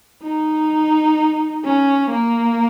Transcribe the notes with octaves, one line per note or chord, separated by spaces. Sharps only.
D#4
C#4
A#3